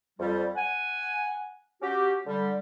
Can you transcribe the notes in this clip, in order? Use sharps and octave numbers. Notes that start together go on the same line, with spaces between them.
F2 G3
F#5 G#5
C#4 F#4 G4
D3 G3